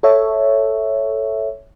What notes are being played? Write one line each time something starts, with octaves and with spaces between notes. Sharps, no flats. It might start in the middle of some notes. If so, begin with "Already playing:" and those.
A4 C#5 E5